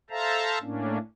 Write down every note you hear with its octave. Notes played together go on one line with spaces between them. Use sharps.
A4 C5 E5 F5 A5 A#5
A2 A#3 C#4 D4